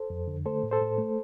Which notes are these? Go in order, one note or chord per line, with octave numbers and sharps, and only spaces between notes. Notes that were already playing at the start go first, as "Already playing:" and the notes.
Already playing: A4 C5
F2
D3
A3 A4 C5
A2
A4 C5
A2
A3